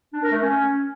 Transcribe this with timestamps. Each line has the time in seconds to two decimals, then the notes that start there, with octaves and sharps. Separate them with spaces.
0.13 D4
0.23 A#4
0.32 A3
0.42 C#4